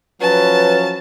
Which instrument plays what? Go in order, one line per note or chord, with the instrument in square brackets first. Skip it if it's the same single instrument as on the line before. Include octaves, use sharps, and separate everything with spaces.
[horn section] F3 F#3 C#4 [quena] B4 [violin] A5